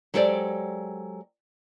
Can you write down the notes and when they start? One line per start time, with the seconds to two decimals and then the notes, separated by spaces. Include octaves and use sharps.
0.14 F#3 G#3 G4 A4 C5 D5